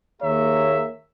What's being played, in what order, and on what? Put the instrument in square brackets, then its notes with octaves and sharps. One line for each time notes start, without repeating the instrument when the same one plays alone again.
[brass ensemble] D#2 A#3 G#4 C#5 E5 A#5